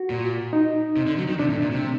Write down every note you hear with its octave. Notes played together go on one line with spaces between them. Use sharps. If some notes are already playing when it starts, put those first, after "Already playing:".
Already playing: F#4
A#2
D#4
C3
D3
F#3
D#3
C3 D4
A2
A#2
C3